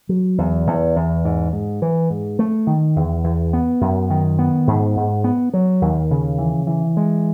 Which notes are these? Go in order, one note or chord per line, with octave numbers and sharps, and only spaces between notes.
F#3
E2
E2
E2
G#2
G#2
E3
G#2
A3
D#3
E2
E2
B3
F#2
D#3
B3
G#2
G#2
B3
F#3
D#2
C#3
E3
E3
G#3